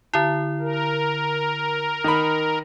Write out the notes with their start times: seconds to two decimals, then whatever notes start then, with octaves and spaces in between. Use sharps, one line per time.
0.14 D3 E4
0.60 A#4
2.04 D#3 B5